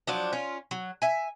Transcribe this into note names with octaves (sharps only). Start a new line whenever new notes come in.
F3 F#3 D4
C#4 F4
F#3
E5 G#5